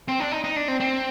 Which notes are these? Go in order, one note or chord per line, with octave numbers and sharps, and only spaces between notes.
C4
D4
D#4
D#4
D4
C4
C4